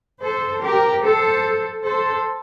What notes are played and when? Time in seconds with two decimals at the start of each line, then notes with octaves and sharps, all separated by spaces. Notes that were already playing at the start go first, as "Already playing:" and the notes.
0.22 A4 C5
0.62 G4 A#4
1.02 A4 C5
1.84 A4 C5